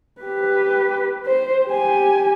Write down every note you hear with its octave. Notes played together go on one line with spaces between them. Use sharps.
G4 B4
C5
G4 G#5